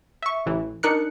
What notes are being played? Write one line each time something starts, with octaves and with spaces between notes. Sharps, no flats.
E5 C#6
A1 E3
D4 D#4 A#4 F#6 C#7